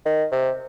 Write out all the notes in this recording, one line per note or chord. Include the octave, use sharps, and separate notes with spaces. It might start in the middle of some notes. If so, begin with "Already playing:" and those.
D#3
C3